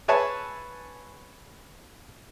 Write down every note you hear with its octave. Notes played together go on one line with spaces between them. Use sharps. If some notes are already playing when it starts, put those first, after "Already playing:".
G#4 B4 C#5 E5 G#5 A5